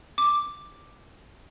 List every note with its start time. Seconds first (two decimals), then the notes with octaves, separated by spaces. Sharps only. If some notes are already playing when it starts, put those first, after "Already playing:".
0.18 D6